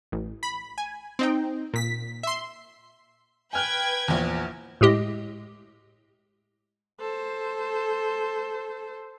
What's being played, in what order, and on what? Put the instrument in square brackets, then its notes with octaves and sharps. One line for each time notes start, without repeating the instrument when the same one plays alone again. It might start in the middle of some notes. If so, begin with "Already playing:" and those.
[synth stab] A1
B5
G#5
C4 D#4 G5
A#2 B6
E5 C6
[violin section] B4 G5 G#6 [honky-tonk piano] G#5 F6 F#6
[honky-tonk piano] A#1 E2
[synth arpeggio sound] A2 G#3 G4 D#5
[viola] A4 C5